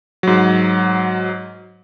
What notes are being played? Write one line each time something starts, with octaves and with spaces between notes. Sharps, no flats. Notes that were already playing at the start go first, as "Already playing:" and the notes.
G#2 F#3